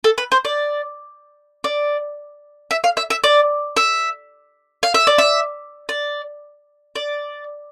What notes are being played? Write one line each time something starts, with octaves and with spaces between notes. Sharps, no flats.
A4
B4
C5
D5
D5
E5
F5
E5
E5
D5
E5
F5
E5
D5
E5
D5
D5